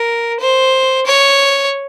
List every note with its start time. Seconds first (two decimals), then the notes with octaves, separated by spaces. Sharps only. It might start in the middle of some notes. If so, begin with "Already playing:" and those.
Already playing: A#4
0.40 C5
1.06 C#5